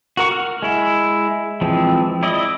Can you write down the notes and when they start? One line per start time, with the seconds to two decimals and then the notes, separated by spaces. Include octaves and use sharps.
0.17 F#4 A#4 C#6
0.32 F6
0.63 G#3 E4
1.61 E3 F3 G#3 C4
2.23 E4 D5 D#5